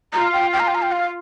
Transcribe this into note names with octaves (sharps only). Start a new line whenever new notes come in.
F4 A#5
G5
G5
A#5
G5
A#5
G5
F5